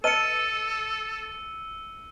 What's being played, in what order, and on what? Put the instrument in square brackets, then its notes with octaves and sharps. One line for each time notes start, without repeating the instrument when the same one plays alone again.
[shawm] A4 [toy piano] B4 D#5 A5 [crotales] E6 [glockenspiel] C#7 D#7